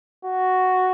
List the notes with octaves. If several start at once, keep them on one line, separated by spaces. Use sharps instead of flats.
F#4